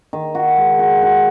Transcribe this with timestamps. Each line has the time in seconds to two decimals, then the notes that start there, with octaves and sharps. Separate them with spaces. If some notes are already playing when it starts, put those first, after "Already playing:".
0.13 D#3
0.35 F#4
0.57 G#3
0.79 F#4
1.02 F#4